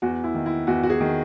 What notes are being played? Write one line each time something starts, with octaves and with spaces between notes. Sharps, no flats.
E2 F#4
E4
D#3
E4
E2 F#4
F#4
G#4
D#3